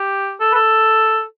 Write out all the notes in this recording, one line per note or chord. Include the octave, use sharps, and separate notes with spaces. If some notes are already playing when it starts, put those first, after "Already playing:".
Already playing: G4
A4
B4
A4